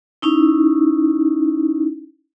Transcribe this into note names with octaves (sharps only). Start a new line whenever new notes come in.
C#4 D#4 E4